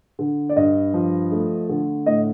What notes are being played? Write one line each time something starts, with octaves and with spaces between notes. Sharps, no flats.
D3
D5
G2 D#5
F3
A3
D3
A2 D#5